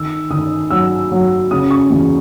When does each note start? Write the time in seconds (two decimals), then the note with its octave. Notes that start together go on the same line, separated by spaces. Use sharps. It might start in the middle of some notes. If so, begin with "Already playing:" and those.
Already playing: D#3 E6
0.30 D#3 D#6
0.70 F#3 E6
1.11 F#3
1.51 C#3 D#6
1.71 C#6
1.90 E2